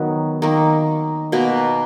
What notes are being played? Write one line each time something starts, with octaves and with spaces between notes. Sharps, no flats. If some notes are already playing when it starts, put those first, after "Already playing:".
Already playing: D#3 F#3 B3
D#3 A#3
B2 A#3